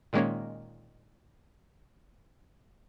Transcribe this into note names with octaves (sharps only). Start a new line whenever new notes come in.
A#2 D#3 G#3 A#3 C#4